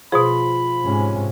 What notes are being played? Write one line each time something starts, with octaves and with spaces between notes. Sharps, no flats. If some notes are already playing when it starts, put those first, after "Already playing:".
B2 F3 G#4 B5
G#2 C3 C#4